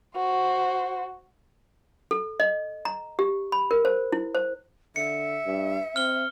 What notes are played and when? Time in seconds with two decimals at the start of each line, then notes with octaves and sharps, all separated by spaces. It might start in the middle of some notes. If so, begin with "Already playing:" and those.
0.16 F#4 C5
2.11 A4
2.40 D#5
2.85 A#5
3.19 G4
3.52 B5
3.71 A#4
3.85 C5
4.12 E4
4.35 C5
4.96 D3 E5 C#7
5.46 G2
5.96 C4 F6 G7